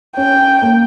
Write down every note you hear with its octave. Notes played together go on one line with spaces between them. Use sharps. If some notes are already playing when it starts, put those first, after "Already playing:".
C#4 G5
A#3